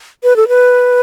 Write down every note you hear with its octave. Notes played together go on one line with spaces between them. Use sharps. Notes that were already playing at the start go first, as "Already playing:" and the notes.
B4
A4
B4